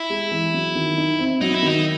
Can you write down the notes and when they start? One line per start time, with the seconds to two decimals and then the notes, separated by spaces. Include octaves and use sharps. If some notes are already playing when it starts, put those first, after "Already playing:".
Already playing: E4
0.10 G#3
0.31 E3
0.54 F#3
0.75 D#3
0.97 D#4
1.20 C4
1.41 F#3 D#4
1.54 E4
1.62 D#3 D#4